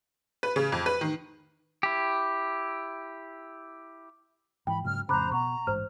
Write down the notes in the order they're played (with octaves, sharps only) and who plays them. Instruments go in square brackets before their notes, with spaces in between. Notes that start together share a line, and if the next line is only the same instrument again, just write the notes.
[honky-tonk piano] B4
C#3
F2
B4
D#3
[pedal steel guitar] E4 G4
[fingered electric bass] G#2 E3 [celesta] G5 [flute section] B5
[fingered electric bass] G#2 C#3 F#3 [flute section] F6
[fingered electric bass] F2 A2 C#3 [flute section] C5 A#5 [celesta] B5 D6 F#6
[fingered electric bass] B2 [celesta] F#5 C#6 [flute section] A#5
[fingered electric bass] A1 G#2 [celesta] C5 F6